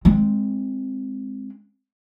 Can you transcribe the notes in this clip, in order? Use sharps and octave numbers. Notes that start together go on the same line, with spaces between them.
G#3 C4